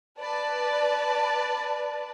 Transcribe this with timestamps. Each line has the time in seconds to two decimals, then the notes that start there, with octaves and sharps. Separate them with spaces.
0.19 B4 D5 A5